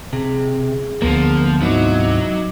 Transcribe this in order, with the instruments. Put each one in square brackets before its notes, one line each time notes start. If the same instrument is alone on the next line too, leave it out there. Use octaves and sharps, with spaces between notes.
[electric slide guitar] C3 [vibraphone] G#4
[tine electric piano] D2 B3 [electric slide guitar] D3 A#3 [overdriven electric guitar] F3
[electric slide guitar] G#2 C3 E4 [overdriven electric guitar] F#3 [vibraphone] D#4 D#5 D6